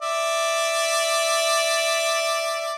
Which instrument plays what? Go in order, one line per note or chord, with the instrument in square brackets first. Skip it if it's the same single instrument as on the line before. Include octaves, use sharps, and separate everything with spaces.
[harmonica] D5 E5